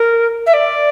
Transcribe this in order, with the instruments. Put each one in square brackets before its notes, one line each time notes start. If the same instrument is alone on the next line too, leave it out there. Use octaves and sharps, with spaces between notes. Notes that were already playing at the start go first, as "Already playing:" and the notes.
Already playing: [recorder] A#4
E5
D5